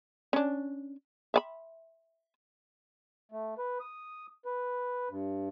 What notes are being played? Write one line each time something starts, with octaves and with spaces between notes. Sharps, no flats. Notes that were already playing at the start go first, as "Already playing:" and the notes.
C#4 D4
E5 F5 B5
A3
B4
D#6
B4
G2